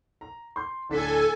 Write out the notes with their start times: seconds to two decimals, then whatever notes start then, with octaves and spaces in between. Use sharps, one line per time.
0.21 A#5
0.56 C6 G6
0.89 D1 D4 A4 G#5 B6